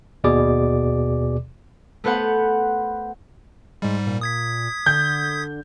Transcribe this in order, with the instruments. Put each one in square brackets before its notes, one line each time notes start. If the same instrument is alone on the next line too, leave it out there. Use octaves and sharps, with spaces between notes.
[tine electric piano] D#2 B2 G#4 D5 D6
[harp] A3 B3 B4 C5 F#5
[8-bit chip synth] G#2 G3 [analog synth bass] G#3
[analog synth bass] A#2
[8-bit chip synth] D#6 G#6 B6
[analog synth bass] D3 [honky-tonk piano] G6